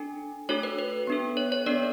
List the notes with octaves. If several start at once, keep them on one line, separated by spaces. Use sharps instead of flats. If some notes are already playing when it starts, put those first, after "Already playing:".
Already playing: D4 A4 G#5
A3 D4 F#4 A4 C#5
B4
B4
B3 D4 A4
C#5
C#5
B3 D4 A4 D5